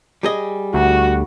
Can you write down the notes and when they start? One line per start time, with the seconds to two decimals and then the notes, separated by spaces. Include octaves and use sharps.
0.23 G3 G#4 D#5
0.74 D2 F#4